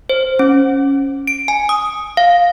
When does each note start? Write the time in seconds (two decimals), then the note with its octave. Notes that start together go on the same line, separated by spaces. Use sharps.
0.10 C5
0.39 C#4
1.27 D7
1.48 G#5
1.69 D#6
2.17 F5